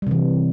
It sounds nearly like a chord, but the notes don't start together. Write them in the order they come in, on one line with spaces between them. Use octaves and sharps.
G3 C3 E3